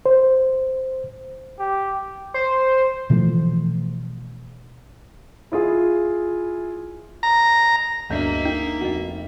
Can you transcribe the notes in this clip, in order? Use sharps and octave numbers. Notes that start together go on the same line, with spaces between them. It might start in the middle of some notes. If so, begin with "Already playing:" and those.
C5
G4
C5
B2 E3 F3 A3
E4 F4 G#4
A#5
E1 D2 G2 A#3 D4 D#5 E5 G6
D#4 G5
F1 D#4 F#4